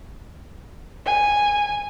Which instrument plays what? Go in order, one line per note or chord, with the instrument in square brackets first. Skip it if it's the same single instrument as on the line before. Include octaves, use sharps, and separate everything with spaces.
[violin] G#5